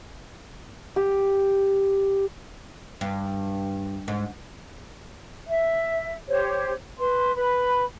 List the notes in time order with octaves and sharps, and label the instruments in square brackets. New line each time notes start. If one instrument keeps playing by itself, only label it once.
[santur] G4
[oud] G2
G#2
[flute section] E5
G4 C5 C#5
B4 C6
B4 B5